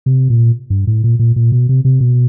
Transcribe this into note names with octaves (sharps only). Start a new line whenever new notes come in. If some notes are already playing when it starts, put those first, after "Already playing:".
C3
A#2
G2
A2
A#2
A#2
A#2
B2
C3
C3
B2